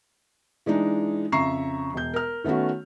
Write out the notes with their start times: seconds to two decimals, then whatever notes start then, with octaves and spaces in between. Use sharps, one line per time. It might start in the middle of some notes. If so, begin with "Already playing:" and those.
0.66 E3 G#3 D4 D#4
1.32 F2 C#3 E5 A#5 C#6 C7
1.93 E1 G6
2.14 A#4 F6
2.44 D#3 A3 B3 C#4 F#4